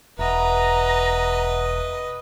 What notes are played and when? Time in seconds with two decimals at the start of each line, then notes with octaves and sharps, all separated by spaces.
0.19 E1 B4 D#5 E5 F#5 A#5